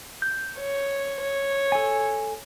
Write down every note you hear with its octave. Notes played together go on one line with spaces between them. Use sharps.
G6
C#5
C#5
A4 G#5